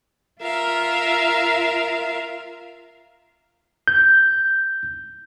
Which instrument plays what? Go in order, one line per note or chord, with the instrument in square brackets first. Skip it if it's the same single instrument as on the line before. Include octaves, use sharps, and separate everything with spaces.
[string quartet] F4 A#4 E5 F5
[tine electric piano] G6